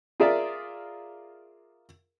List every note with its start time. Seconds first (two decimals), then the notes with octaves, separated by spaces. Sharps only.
0.20 F4 G#4 A#4 D5 E5